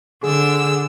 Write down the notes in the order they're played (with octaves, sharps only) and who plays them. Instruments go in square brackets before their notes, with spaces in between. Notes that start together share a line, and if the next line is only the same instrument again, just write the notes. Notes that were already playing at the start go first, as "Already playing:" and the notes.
[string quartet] D3 E6 [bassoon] G#4